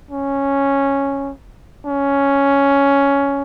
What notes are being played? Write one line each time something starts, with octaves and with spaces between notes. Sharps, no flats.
C#4
C#4